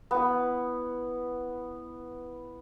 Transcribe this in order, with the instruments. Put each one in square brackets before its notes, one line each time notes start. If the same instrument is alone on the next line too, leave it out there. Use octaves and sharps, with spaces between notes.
[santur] B3 E4